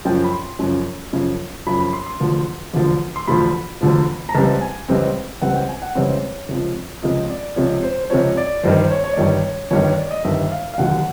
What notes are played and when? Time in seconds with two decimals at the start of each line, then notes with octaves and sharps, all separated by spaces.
0.05 F#2 C#3 F3 G5
0.24 B5
0.32 C6
0.59 F#2 C#3 F3
1.13 F#2 C#3 F3
1.67 F#2 C#3 F3 B5
1.80 B5
1.93 C6
2.07 C6
2.20 E1 D2 D3 F3
2.74 E1 D2 D3 F3
3.16 C6
3.28 E1 D2 D3 F3 B5
3.81 E1 D2 D3 F3
4.29 A#5
4.35 C#2 C#3 E3 G3 C4 A5
4.61 G#5
4.88 C#2 C#3 E3 G3 C4
5.42 C#2 C#3 E3 G3 C4 F#5
5.56 G5
5.69 G#5
5.82 F#5
5.95 C#2 C#3 E3 G3 C4 C#5
6.49 C#2 C3 F3
7.03 C#2 C3 F3 D#5
7.30 D5
7.56 C#2 C3 F3 C#5
7.83 C5
8.04 C5
8.10 C#2 C3 F3 C#5
8.37 D5
8.63 G1 G2 D#3 C5
8.77 C5
8.91 C#5
9.04 C#5
9.13 D5
9.17 G1 G2 D#3 C#5
9.71 G1 G2 D#3 C#5
9.84 C#5
9.98 D5
10.11 D#5
10.24 G1 G2 D#3 E5
10.52 F5
10.74 F5
10.78 F1 D#2 D3 F#3 F#5